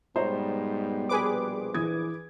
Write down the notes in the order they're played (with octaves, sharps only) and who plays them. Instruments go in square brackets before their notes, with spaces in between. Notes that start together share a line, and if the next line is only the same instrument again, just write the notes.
[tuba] G#2 [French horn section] B2 G3 B3 [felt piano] C5 C#5 A#5
[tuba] A#1 [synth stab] G#4 B4 D6
[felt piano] E3 D#6 G#6